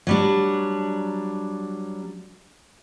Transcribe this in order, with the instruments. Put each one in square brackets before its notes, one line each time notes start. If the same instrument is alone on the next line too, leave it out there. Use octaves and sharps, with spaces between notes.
[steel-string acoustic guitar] F#3 G3 D4